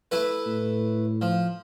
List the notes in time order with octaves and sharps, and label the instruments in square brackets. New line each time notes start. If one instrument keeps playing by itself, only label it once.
[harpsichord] A3 E4 B4
[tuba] A2
[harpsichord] F3